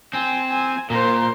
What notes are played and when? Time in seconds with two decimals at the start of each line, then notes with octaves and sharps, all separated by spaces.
0.13 C4 G#5
0.50 G#5
0.90 A#2 A#4 C5